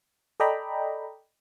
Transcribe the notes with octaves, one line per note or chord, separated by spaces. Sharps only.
A4 D5 D#5 G5 A#5 B5